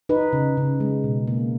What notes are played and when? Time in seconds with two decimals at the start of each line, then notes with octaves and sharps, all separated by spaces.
0.09 D#4 B4
0.33 C#3
0.57 C#3
0.80 G#3
1.04 B2
1.27 A#3